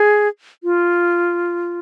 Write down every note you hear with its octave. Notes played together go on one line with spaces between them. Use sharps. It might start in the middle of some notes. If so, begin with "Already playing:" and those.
Already playing: G#4
F4